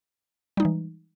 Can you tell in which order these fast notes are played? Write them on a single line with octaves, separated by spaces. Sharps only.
G3 D#4 G#3 E3